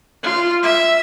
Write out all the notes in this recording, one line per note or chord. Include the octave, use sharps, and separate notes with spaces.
F4
E5